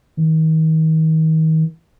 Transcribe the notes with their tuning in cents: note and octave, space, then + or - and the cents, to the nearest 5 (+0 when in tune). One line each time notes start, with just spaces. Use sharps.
D#3 +35